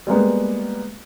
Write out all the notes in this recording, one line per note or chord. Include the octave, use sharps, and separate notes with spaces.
G3 G#3 A#3 B3